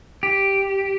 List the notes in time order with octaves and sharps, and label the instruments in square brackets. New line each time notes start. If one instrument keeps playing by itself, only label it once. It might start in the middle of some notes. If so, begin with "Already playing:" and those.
[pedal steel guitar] G4